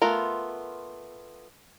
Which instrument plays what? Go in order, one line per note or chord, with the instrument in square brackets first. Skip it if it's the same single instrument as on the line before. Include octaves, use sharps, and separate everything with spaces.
[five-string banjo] A3 B3 F4 A#4